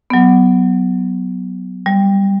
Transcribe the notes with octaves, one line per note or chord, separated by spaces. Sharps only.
F#3 B3
G3